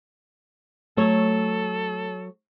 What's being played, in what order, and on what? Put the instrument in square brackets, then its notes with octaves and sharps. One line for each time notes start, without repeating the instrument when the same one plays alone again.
[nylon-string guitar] F#3 C#5 [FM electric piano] A3 [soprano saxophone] A4